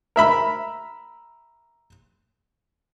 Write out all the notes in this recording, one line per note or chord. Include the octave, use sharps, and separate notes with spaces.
A#4 E5 B5